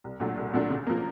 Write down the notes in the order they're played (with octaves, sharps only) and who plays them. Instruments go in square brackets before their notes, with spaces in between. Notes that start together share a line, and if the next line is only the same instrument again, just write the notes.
[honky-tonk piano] C2
A#2 F#3 A3 D4
C2
A#2 F#3 A3 D4
C#3
F3 A#3